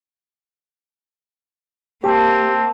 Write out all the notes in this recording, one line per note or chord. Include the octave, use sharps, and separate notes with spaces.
A#3 C4 G4 A5